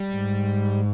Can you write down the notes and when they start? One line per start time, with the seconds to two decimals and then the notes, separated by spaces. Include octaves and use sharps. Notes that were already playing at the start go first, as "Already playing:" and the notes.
Already playing: G3
0.12 G#2